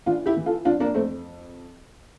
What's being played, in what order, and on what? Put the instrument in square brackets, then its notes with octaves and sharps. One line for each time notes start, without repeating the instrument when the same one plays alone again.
[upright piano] E3 D4 F4
E4 G4
E3
F4 A4
F2 D4 F4
A#3 D4
F2 A3 C4